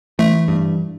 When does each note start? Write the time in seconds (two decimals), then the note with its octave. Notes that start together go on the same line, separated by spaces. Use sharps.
0.19 E3 A3
0.48 G2